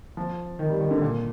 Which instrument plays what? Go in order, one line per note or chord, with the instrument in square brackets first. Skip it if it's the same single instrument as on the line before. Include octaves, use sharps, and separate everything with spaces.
[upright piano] F3
D#3
G3
D#3
D3
A#2